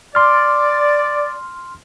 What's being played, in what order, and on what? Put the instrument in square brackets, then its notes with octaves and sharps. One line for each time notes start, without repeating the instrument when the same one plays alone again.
[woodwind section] D5 [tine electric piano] C6 F6